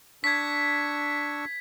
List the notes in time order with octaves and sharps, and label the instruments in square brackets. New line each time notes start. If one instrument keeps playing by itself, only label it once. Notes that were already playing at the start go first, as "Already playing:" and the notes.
[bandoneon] D4 C#6 E6 [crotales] G#6 B6